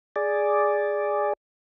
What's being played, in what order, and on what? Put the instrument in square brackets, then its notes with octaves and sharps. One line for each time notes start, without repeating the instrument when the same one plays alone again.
[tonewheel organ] G#4 D5